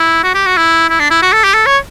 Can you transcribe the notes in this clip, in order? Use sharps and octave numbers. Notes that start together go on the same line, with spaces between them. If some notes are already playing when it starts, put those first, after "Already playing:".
Already playing: E4
F#4
G4
F#4
E4
E4
D4
E4
F#4
A4
G4
A4
C#5